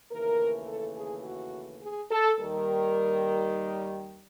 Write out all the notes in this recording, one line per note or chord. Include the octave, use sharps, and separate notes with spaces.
D#2 C#3 E3 A3 A#4
A4
G#4
F#4
G#4
A4
D#2 D#3 G3 A#4